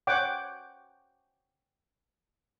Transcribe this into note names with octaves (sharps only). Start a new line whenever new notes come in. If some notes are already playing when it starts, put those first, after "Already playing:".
C#5 F#5 G5 D6